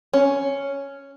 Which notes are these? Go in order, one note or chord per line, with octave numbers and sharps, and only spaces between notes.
C#4